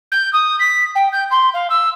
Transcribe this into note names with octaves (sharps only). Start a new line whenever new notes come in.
G6
D#6
B6
G5
G6
C6
F5
E6